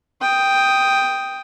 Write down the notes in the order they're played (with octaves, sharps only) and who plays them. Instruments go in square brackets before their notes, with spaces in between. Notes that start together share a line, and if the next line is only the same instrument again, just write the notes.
[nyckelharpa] G5 D#6